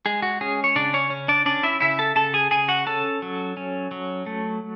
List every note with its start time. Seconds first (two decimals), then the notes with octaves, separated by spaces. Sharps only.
0.06 G#3 G#4
0.22 F#4
0.41 C#4 G#4
0.64 C#5
0.76 C#3 D4 D5
0.94 C#4 C#5
1.10 C#4
1.28 D4 D5
1.46 C#4 D4 D5
1.63 E4 E5
1.80 C#3 E4 E5
1.99 A4 A5
2.16 C#3 A4 A5
2.34 G#4 G#5
2.51 C#3 G#4 G#5
2.68 F#4 F#5
2.87 C#4 A4 A5
3.22 F#3
3.57 C#4
3.91 F#3
4.26 A3